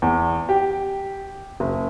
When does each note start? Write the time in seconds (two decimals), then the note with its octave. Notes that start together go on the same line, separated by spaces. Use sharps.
0.02 E2
0.49 G4
1.60 F#1